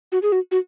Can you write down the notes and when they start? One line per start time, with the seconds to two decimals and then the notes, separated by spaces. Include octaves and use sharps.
0.12 F#4
0.22 G#4
0.32 F#4
0.51 F#4